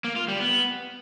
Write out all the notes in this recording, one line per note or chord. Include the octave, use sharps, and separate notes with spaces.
A#3
F4
G3
B3